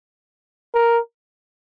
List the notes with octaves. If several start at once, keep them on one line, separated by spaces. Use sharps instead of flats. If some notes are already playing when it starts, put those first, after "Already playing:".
A#4